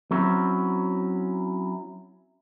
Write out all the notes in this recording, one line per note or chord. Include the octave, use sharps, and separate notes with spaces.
F#3 C4 C#4 E4 F#4